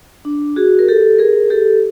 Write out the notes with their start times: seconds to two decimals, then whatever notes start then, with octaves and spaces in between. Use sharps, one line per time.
0.25 D4
0.56 F#4 G#4
0.79 A#4
0.88 G4 A4
1.18 G#4 A#4
1.50 G4 A4